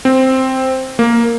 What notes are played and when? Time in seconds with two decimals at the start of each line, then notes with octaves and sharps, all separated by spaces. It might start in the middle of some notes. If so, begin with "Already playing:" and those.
0.05 C4
0.99 A#3